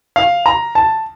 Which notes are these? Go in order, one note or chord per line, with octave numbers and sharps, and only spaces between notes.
F5
A#5
A5